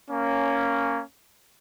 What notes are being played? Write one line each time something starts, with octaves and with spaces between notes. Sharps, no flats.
A#3 C#4